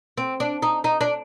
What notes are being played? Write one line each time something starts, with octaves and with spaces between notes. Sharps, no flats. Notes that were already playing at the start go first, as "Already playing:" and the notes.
C4
D4
D#4
D#4
D4